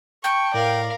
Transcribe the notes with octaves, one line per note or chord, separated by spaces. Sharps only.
G5 A5 C#6
A2 A#4 D5 F5